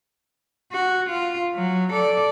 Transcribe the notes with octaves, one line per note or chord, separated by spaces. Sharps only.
F#4
F4
F#3
A4 D5